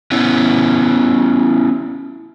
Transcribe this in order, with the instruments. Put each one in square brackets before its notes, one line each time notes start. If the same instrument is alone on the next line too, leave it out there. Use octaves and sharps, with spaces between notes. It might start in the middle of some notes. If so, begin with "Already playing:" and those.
[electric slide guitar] B3 C#4 E4